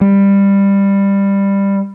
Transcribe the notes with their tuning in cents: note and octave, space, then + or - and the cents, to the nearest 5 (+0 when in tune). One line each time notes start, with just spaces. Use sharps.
G3 +15